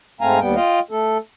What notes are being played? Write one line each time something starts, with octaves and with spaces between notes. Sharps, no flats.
G#2 A3 C4 F5 G#5 A#5
D#2 G3 B3 G5
F4 D#5 F5 G5
A3 A4